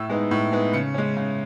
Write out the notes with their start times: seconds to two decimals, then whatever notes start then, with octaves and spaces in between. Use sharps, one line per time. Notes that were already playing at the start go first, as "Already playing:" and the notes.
Already playing: A2 E6
0.09 G#3 B3 D#4
0.31 A2
0.52 G#3 B3 D#4
0.74 C#3 C#7
0.94 G#3 C#4
1.17 C#3